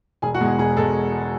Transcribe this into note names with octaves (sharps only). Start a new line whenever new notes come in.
E1 G#4 G#5
F#4 F#5
E2 B2 G#3
G#4
E1 G#4
B2 G#3 A4